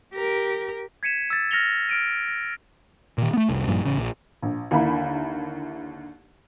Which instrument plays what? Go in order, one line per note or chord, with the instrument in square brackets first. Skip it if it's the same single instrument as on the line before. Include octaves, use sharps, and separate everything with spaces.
[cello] G4 A#4
[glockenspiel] G#6 B6 C#7 D#7 E7
E6 A6
F6 A#6 C#7 F7 G7
F6 D7 D#7
A#6
[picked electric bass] A#2 D#3
A3 B3
F1 C2
A#1 G2 A#2 F3
A1 C#3
A#1
[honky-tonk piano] A#1
D#2 D3 A#3 E4 B5